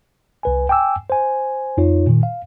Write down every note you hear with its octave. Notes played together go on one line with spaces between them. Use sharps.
C2 B4 G#5
G5 G#5 D6 E6
C5 G#5
F2 D#4 F4 C#5
A#2 D#3
F5